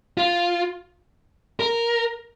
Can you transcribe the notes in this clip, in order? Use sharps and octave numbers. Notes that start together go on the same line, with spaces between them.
F4
A#4